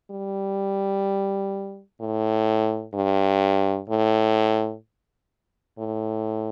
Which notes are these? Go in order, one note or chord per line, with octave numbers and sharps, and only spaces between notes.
G3
A2
G2
A2
A2